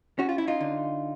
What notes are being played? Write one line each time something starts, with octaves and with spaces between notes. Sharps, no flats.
C#4 F#4
F4
E4
D#4 F4
D3